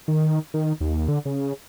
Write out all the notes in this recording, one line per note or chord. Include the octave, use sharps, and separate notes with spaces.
D#3
D#3
D#2
D3
C#3